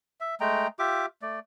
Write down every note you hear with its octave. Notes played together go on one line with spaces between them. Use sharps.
E5
G#3 A3 G5 A#5
F4 G4 E5 D6
A3 D5